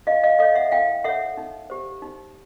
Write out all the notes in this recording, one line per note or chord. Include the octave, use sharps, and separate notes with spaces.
E4 D#5 F5
D#5 F5
A4 C#5 D#5 F5
E5 F#5
E4 F5 G5
A4 C#5 E5 F#5
D#4
G4 C5
D#4